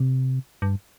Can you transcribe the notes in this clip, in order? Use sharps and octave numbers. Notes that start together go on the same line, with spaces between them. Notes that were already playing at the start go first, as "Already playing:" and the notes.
Already playing: C3
G2